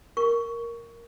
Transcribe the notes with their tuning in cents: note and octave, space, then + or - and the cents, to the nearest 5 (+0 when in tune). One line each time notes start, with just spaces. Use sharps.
A#4 +0 C#6 +15